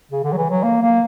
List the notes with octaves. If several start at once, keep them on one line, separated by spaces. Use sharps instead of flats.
C#3
D3
F#3
E3
F#3
A#3
A#3